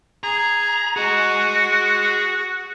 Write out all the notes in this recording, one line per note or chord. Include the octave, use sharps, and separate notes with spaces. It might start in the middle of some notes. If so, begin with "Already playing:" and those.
G#4 A#5
F#4 G#4 D#5